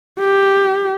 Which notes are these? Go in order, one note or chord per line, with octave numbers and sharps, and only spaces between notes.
G4